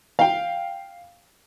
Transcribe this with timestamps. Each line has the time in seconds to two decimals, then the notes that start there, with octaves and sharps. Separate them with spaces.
0.19 F5 G5